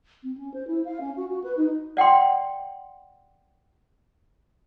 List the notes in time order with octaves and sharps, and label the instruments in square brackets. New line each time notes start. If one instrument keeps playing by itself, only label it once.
[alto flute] C4
C#4
C5
E4
F5
C#4
F#4
F#4
B4
D#4
[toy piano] D5 F#5 G5 C6